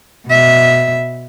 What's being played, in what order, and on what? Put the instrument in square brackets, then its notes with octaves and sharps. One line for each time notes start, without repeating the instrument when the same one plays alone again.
[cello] B2 E5